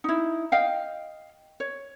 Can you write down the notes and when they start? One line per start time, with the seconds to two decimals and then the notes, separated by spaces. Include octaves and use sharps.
0.04 D#4 E4
0.52 D#5 F5 G5
1.60 C#5